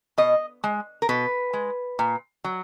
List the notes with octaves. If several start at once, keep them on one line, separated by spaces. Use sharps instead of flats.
B2 D#5
G#3
A#4
B2 B4
G#3
A#2
F#3